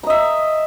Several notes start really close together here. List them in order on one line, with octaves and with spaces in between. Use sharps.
A#5 D#5 E5